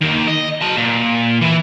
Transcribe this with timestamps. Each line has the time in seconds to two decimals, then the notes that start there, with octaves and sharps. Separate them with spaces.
0.02 D#3 A#3
0.28 D#5
0.62 F#3 A5
0.77 A#2
1.42 E3 E4